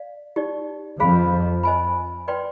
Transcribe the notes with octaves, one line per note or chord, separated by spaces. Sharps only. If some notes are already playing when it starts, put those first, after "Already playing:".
Already playing: D5 F5
D#4 G4 D5
F2 F3 G#4 C5 F5 B5
C5 D#5 G#5 B5
B4 D5 G5 C6